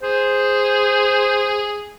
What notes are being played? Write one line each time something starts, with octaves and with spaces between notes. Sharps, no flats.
G#4 C5